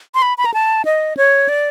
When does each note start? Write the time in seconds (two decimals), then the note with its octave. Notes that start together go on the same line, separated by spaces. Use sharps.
0.15 C6
0.22 B5
0.38 B5
0.45 A#5
0.54 A5
0.85 D#5
1.17 C#5
1.49 D5